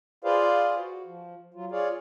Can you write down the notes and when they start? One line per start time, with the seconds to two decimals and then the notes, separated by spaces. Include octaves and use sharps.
0.24 F4 G#4 B4 C5 D5 F5
0.79 F#4
1.06 F3
1.54 F#3 F4
1.72 F4 G#4 C#5 D5 F5